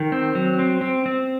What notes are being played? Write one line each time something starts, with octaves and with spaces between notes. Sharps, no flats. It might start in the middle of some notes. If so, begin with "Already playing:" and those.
Already playing: D#3
C4
F#3
C4
C4
C4